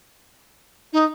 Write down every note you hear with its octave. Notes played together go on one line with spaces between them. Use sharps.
D#4